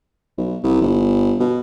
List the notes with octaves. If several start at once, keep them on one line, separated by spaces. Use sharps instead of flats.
B1
C2
G1
B2